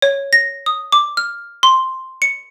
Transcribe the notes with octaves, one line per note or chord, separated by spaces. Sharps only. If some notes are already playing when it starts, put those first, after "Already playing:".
C#5
A#6
D#6
D6
F6
C6
C#7